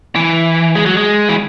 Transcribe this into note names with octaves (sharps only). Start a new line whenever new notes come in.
E3
G#3
F#3
G#3
E3